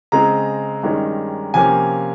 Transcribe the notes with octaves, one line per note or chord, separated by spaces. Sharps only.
C#3 G#3 C4 A#5
G2 D#3 G#3 C#4
C3 F3 A#3 C#4 G#5